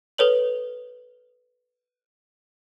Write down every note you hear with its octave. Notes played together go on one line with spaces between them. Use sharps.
A4 B4 C#5 F#7